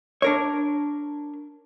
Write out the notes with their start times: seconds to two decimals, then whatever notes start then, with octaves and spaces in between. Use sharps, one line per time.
0.22 D4 A#4 C#5